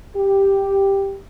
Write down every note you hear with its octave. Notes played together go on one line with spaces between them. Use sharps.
G4